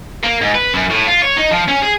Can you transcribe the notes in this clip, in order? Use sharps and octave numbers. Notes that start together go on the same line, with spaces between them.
A#3
G#2
B4
F#2
A2
F4
C#5
D#4
F3
C#4
G#4